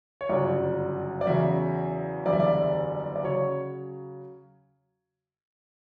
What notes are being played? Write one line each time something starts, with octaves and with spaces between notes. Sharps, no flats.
C#5
G1 F#2 C#3 F#3 D5
D5
E2 C#3 F#3 E5
F#1 E2 D3 G3 D5
E5
D5
D5
C#3 F#3 C#5